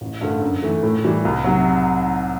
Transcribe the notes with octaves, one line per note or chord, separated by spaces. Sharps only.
A1
G2 D3 A3
F#2
E3 A3
A2
E3 G3
C2
C3 F#3